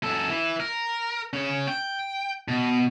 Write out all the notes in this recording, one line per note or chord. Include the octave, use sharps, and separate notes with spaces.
F#2 A4
E3 E4
A#4
C#3 C#4
G5
B2